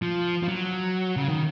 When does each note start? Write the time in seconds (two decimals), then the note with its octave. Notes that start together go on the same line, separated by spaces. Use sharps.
0.02 F3
0.43 F3
0.49 F#3
1.17 C#3
1.29 D#3